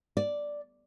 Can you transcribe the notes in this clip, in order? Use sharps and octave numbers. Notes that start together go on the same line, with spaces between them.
D5